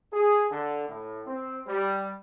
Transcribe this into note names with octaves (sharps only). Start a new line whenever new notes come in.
G#4
D3
A2
C4
G3